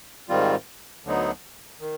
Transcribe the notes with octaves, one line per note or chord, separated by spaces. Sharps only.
G#2 D#3 G3 C4 F4
D2 D3 F#3 B3 D#4
D#3